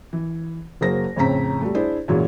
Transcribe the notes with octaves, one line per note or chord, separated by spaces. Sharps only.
E3
F#1 F#3 A#3 G#4 C5 A#6
F2 A2 C#3 C4 A#5 B6
G3 A3
D4 E4 G#4 C5
F#2 A#2 E3 F#3 G#3